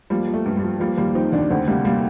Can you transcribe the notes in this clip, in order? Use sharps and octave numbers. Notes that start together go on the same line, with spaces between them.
F3 G3 A#3
F3
A3
G2
G3
F3
F3 G3 A#3
D#2 G3 A#3
F3 C4 D#4
D#2 A#3 D4
D2 A3 C4
C3 G3 A#3
G3 A#3